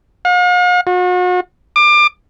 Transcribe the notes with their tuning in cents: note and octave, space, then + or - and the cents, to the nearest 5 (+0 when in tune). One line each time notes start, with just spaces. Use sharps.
F5 +45
F#4 -40
D6 +30